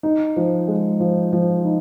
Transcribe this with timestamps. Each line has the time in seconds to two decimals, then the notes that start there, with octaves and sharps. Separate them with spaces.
0.03 D#4
0.36 F3
0.68 G#3
1.00 F3
1.33 F3
1.65 D#4